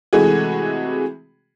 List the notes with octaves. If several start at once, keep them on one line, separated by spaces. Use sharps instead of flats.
C3 E3 G#3 A3 F#4 G#4